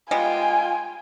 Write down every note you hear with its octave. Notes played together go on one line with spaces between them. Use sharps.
G3 G#3 B3 F4 G5 G#5